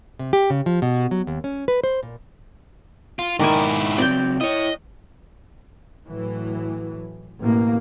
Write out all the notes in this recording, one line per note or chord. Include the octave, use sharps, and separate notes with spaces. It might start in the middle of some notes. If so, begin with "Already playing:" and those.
C3
G4
C#3
F3
B2
F#3
D#2
C#4
B4
C5
A#2
F4
G#2 D#3 E4 D5 G#5
C#3 F#3 C4 D5 G5
E4 C#5 D#5
A2 E3 F#3
A1 B2 A#3